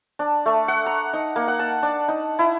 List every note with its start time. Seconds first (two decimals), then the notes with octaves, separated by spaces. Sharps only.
0.19 D4
0.46 A3
0.68 F#5
0.86 A#5
1.13 D#4
1.36 A#3
1.48 F#5
1.59 A5
1.83 D4
2.08 D#4
2.39 E4